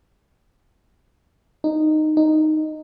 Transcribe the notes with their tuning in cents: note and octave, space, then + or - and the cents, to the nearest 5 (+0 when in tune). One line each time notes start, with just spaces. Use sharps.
D#4 -10
D#4 -5